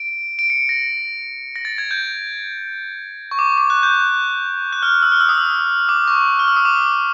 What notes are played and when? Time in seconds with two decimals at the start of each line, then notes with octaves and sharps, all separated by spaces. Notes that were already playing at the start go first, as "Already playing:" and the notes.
Already playing: D7
0.39 D7
0.50 C#7
0.69 A#6
1.56 A#6
1.65 A6
1.78 G#6
1.91 G6
3.31 C#6
3.39 D6
3.58 D6
3.70 F#6
3.83 G6
4.73 F#6
4.82 F6
5.02 E6
5.12 F6
5.20 E6
5.29 D#6
5.38 E6
5.89 D6
6.07 C#6
6.39 F6
6.48 E6
6.56 D#6
6.65 D6